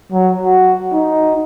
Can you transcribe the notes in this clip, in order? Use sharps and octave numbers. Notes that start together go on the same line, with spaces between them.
F#3
F#4
D#4